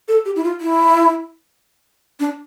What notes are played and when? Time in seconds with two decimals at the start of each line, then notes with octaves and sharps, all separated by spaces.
0.08 A4
0.25 G4
0.36 E4
0.44 F4
0.61 E4
2.20 D4